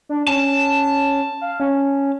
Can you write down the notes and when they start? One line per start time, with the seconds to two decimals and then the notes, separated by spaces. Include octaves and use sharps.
0.09 D4
0.27 C#4 A5
1.41 F5
1.60 C#4